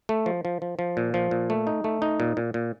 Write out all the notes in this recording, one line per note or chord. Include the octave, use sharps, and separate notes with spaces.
A3
F3
F3
F3
F3
A#2
F3
A#2
A3
D#4
A3
D#4
A#2
A#2
A#2